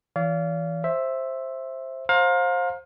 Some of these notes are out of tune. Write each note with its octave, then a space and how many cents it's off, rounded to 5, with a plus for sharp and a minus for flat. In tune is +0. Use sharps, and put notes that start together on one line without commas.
E3 +0 D5 -40 F5 -15
C5 +15 E5 +0
C5 +20 F5 +30 A#5 +0